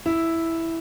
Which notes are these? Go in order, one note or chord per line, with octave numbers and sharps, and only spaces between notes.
E4